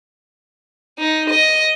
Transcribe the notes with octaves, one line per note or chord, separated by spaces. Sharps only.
D#4
D#5